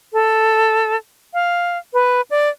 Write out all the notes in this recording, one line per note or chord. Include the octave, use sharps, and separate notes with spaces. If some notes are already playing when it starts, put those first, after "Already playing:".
A4
F5
B4
D5